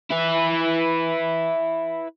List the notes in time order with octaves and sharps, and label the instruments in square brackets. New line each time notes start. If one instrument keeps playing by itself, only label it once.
[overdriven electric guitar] E4 B4